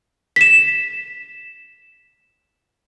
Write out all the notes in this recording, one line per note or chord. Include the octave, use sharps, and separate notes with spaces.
B6 E7